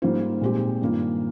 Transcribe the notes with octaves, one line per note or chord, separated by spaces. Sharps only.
G#2 G3 A#3 F4 C5
A#2 G#3 C4 D#4 G4
G2 D#3 A#3 F4